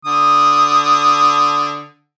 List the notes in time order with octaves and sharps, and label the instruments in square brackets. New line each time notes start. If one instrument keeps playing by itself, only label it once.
[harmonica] D3 D#6